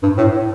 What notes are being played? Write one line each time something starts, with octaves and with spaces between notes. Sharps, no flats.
G2
A2